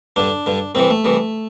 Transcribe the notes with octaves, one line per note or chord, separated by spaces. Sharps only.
G2 D3 D4
G2 D3
C2 C3 E3 C4
A3
C2 C3 E3